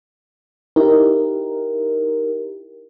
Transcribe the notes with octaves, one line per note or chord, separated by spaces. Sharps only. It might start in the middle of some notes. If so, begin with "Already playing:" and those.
D#4 E4 G4 A#4